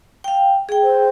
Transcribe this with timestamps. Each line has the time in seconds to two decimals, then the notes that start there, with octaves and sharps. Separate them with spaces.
0.24 F5 G5
0.69 G#4 G5
0.83 C5